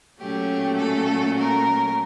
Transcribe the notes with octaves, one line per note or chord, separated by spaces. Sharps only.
A#2 F#3 A3 C#4 G4
A4
A#4